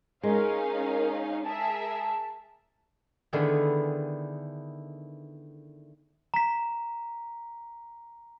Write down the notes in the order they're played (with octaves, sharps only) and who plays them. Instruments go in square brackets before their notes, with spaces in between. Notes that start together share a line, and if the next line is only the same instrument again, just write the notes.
[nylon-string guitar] G#3 [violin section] C#4 D#4 F5 [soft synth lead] A#4
[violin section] G#4 A#4 E5 [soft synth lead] A5
[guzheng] D3 D#3 A3 B3 E4 G#4
[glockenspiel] A#5 B6